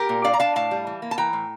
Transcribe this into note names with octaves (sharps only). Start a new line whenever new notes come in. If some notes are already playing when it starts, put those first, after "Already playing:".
Already playing: G4 A#4
A#2
D4 D5 F5
A#5
D4 F5 A5
A2 F5 A5
G3
E3
A#3
A5
E3 G5 A#5
A2